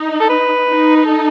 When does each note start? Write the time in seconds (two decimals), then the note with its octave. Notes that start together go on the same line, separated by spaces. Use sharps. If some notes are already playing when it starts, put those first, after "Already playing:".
Already playing: D#4
0.20 A4
0.29 B4
0.67 D#4
0.97 B4
1.05 A4